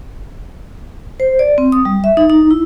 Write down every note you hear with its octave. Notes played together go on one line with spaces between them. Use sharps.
C5
D5
C4
D#6
G3
E5
D#4
D#4
E4